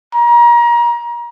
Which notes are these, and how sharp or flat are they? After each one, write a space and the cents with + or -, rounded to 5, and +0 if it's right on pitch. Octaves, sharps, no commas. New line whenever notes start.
A#5 +30